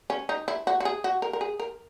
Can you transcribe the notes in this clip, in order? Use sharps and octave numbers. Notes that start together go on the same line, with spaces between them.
C#4
D#4
E4
F#4
F#4
G#4
F#4
A#4
A#4
G#4
A#4